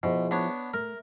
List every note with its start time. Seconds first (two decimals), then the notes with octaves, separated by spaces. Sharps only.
0.03 B2 F3 E4 G#4
0.31 B3 D4 C#5
0.74 A3 A#4